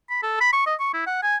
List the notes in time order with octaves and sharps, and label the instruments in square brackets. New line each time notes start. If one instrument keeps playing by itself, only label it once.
[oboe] B5
A4
B5
C#6
D#5
C#6
E4
F#5
G#5